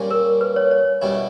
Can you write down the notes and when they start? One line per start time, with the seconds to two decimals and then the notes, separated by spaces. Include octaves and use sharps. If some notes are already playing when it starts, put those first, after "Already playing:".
Already playing: A#2 G3 A#3 C#4
0.11 A#4
0.41 B4
0.56 C#5
0.71 C#5
1.02 B2 G3 C#4 E4